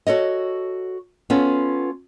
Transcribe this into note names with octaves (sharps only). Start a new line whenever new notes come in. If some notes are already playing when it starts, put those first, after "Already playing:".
F#4 A4 C#5 D#5
B3 C#4 F4 A4